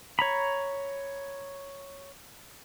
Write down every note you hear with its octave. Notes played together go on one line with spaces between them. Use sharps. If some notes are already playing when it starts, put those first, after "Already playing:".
C#5 A#5 B5